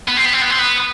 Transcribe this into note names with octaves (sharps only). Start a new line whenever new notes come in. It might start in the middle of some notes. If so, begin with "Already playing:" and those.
B3
C4
B3
C4
B3
C4
B3